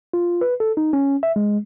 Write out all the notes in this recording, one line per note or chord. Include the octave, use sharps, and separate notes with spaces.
F4
B4
A4
D#4
C#4
E5
G#3